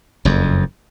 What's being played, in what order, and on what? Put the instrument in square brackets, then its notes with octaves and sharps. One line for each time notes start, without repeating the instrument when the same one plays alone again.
[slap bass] F#1 F2